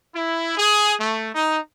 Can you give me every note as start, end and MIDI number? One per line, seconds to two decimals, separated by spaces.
0.13 0.55 64
0.57 0.94 68
0.98 1.30 57
1.34 1.59 63